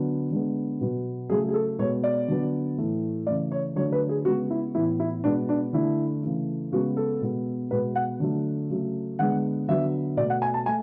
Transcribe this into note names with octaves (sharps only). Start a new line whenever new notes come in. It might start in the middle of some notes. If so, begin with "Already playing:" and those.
Already playing: D3 F#3 B3
D3 G#3 B3
B2 F#3 B3
C#3 F#3 A3 G#4
G#4
A4
B2 G#3 B3 C#5
D5
D3 F#3 B3
A2 E3 A3
C#3 E3 A3 D5
C#5
D3 F#3 A3 C#5
B4
G#4
C#3 G#3 B3 F#4
E4
A2 E3 B3 E4
E4
B2 G#3 B3 D4
D4
D3 A3 E4
C#3 E3 A3
C#3 G#3 B3 F#4
A4
B2 G#3 B3
B2 G#3 B3 B4
F#5
D3 F#3 A3
C#3 F#3 A3
D3 G#3 B3 F#5
D3 F#3 B3 E5
B2 A3 D5
F#5
G#5
A5
A3 G#5